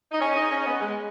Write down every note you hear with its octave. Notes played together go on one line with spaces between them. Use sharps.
D#4
C#4 G#4 D#5 G#5
D#4
C#4
B3
G#3